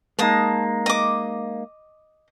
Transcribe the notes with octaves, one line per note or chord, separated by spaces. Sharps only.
G#3 A#3 D#4 A5 D#6
D#5 D6